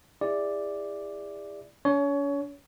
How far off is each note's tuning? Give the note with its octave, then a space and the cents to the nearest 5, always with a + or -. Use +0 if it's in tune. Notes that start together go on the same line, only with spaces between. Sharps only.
E4 +0 G#4 -40 D5 +0
C#4 +45 C#5 +25